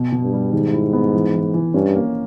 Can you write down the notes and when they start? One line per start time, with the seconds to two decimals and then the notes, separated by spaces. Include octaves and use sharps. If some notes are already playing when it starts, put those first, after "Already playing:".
Already playing: B2
0.12 B2
0.23 G2
0.33 G3
0.53 G#2 D#3
0.73 E4
0.93 B3
1.14 E3
1.34 E3
1.54 E3
1.74 G2 C#4
1.95 A#3